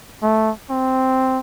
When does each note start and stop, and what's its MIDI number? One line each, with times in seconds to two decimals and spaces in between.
0.22 0.51 57
0.70 1.40 60